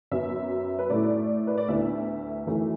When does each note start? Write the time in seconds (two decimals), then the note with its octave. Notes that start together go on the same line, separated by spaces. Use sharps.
0.11 F#2 F#3 B3 E5
0.79 B4
0.90 A2 A3 E4 D5
1.47 B4
1.58 D5
1.68 D2 D3 B3 E4 E5
2.47 F#2 E3 A3